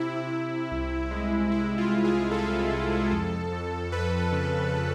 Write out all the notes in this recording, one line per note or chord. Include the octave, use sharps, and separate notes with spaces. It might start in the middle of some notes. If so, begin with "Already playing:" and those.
Already playing: C3 E4
C3
C2
G#3
G#3 E4
F4
G#3
G#4
C3 A4
C3
F2
F2
F2 B4
C#3